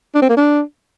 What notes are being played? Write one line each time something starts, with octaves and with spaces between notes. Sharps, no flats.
D4
C4
A#3
D4